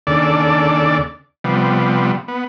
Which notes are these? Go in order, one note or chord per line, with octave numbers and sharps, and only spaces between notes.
D#2 C#3 D4 A4 D5
C3 F3 G3 B3
B3